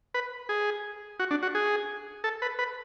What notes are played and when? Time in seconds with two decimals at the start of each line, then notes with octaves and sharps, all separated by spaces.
0.14 B4
0.49 G#4
1.19 F#4
1.31 D4
1.43 F#4
1.55 G#4
2.24 A4
2.42 B4
2.59 B4